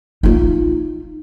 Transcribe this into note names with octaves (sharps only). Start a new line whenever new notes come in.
D#4 F4